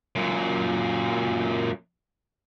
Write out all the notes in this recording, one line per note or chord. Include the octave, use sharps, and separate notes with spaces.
F#2 A#2